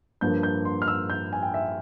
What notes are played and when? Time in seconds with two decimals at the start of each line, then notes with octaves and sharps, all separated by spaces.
0.21 G2 F3 A#3 G6
0.43 G6
0.65 C6
0.82 F6
0.88 E6
1.10 G6
1.33 G#5
1.43 G5
1.54 E5